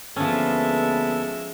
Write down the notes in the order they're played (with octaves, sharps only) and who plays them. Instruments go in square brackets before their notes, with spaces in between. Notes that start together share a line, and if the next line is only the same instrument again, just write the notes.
[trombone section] D2 A#3 B3 [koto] F3 C#4 [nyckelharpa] G#3 E5 [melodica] A4